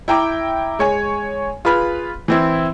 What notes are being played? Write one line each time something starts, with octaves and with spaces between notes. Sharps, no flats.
E4 G5 A#5 D6
G#3 C#5 G#5
F4 G#4 B4 B5 F6
E3 C4 E4